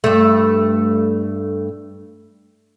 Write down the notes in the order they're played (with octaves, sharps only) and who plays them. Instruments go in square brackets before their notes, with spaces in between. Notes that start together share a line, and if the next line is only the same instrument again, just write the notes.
[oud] G2 A3